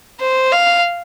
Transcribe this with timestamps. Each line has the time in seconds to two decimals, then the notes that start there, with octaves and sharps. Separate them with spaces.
0.20 C5
0.52 F5